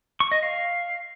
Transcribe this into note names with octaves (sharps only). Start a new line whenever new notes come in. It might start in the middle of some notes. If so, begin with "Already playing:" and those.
C#6
D#5
F5